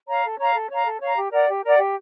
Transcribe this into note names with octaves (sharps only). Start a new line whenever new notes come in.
C#5 F5 A#5
A4
C#5 F5 A#5
A4
C#5 F5 A#5
A4
C#5 F5 A#5
G4
A#4 D5 F#5
G4
A#4 D5 F#5
G4